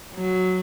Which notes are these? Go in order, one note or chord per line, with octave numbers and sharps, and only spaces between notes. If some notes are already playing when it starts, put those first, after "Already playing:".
F#3